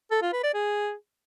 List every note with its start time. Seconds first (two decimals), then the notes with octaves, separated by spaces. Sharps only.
0.11 A4
0.22 F4
0.33 B4
0.44 D5
0.54 G#4